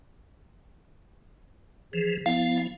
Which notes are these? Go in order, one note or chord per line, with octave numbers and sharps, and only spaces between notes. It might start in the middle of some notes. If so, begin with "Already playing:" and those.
E3 F3 G#4
F3 B3 E4 F5